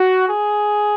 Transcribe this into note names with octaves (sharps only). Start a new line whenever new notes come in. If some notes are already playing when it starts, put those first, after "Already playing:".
Already playing: F#4
G#4